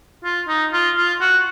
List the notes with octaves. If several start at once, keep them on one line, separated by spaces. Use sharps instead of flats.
F4
D#4
F4
F4
F#4